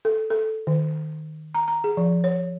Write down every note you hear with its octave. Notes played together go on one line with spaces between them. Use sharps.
A4
A4
D#3
A#5
A#5
G#4
F3
C#5